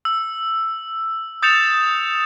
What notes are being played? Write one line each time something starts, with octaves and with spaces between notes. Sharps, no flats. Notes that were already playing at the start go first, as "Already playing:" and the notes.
E6
D#6 G6 A6 C#7 E7 F7